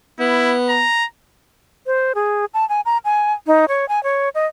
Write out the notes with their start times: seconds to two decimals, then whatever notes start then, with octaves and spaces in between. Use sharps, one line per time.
0.19 B3 E4
0.69 A#5
1.87 C5
2.15 G#4
2.54 A5
2.69 G#5
2.86 A#5
3.05 G#5
3.47 D#4
3.68 C#5
3.89 G#5
4.03 C#5
4.35 D#5